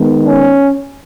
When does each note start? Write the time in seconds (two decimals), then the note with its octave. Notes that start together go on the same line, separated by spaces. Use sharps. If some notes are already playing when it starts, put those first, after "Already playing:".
Already playing: D#3 G#3 B3
0.25 C#4